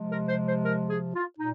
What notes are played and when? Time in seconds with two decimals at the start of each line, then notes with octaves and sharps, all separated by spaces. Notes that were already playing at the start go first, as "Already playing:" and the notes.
Already playing: C3 F3 G#3
0.11 A#4
0.28 C5
0.47 C5
0.65 A#4
0.90 G#4
1.15 F4
1.39 A#2 D#4